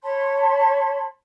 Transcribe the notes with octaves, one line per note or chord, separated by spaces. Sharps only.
C#5 A5 B5 C6